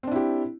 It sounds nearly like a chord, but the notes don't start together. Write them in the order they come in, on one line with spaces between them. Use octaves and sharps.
C4 D4 E4 G4